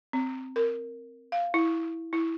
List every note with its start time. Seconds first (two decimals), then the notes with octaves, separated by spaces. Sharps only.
0.13 C4
0.56 A#4
1.32 F5
1.54 E4
2.13 E4